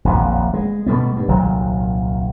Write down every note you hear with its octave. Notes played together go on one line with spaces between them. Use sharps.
D#1 A#1 F2
G#3
B2 G3 A3 B3
G2
D#1 C2 D#3 F#3